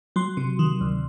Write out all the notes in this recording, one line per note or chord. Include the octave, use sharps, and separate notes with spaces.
F#3 C6
C3
D#3
D2